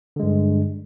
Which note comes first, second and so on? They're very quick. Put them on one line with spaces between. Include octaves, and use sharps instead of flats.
D3 G#3 G2